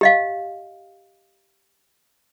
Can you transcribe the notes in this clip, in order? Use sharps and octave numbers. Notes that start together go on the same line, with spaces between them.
G4 D#5 F5